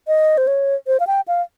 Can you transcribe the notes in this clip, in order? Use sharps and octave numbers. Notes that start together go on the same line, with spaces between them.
D#5
C5
C#5
C5
F5
G5
F5